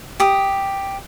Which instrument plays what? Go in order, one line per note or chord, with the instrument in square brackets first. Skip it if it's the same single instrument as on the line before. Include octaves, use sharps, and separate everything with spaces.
[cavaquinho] G4 D#6